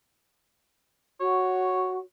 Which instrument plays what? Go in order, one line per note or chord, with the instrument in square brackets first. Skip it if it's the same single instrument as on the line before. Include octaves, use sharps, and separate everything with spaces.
[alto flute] F#4 [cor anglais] C#5